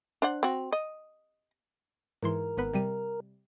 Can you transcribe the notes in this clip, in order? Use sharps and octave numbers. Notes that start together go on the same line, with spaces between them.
D4 C5 F#5
C4 F#4
D#5
G#2 E3 A#4 C6
G#1 B3 B4
C3 G3 D#7